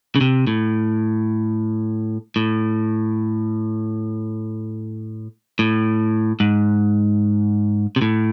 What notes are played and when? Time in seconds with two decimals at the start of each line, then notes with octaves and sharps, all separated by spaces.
0.16 C#3
0.21 C3
0.47 A2
2.36 A2
5.59 A2
6.40 G#2
7.96 C3
8.02 A2